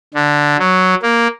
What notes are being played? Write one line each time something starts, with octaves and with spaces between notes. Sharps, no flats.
D3
F#3
A#3